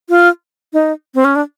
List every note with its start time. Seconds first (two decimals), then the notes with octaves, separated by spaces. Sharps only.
0.09 F4
0.73 D#4
1.15 C4
1.25 C#4
1.36 D4